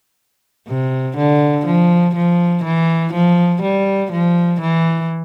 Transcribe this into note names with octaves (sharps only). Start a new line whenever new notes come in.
C3
D3
F3
F3
E3
F3
G3
F3
E3